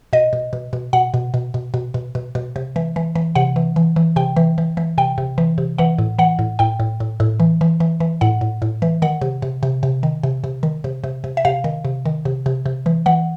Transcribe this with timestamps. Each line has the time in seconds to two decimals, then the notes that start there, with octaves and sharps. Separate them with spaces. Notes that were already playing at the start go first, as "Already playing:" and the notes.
0.13 B2 D#5
0.33 B2
0.53 B2
0.73 B2
0.93 B2 F#5
1.14 B2
1.34 B2
1.54 B2
1.74 B2
1.94 B2
2.15 B2
2.35 B2
2.56 C3
2.76 E3
2.96 E3
3.16 E3
3.35 C3 F#5
3.56 E3
3.76 E3
3.96 E3
4.16 C3 G5
4.37 E3
4.58 E3
4.77 E3
4.98 C3 G5
5.18 C3
5.38 E3
5.58 C3
5.78 E3 F#5
5.98 A2
6.19 E3 F#5
6.39 A2
6.59 A2 G5
6.80 A2
7.00 A2
7.20 A2
7.40 E3
7.61 E3
7.80 E3
8.00 E3
8.21 A2 F#5
8.41 A2
8.62 A2
8.82 E3
9.02 D#3 F#5
9.21 C3
9.42 C3
9.63 C3
9.83 C3
10.03 D#3
10.23 C3
10.44 C3
10.63 D#3
10.84 C3
11.04 C3
11.24 C3
11.37 E5
11.45 C3 F5
11.64 D#3
11.85 C3
12.06 D#3
12.25 C3
12.46 C3
12.66 C3
12.86 E3
13.06 E3 F#5